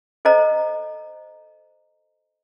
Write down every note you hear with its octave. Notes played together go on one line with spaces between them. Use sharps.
A4 C5 D#5 A#5